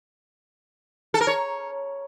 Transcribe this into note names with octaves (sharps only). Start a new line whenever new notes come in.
A4
A#4
C#5